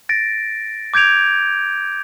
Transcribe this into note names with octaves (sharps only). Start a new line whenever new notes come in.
A6 A#6 D7
D6 G6 G#6 D7 F7